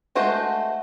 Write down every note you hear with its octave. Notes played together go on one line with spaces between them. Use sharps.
G#3 A3 F#4 C5